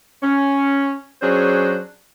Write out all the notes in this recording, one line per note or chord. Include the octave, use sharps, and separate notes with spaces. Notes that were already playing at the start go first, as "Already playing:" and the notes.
C#4
F#3 C#4 D4 G#4 C5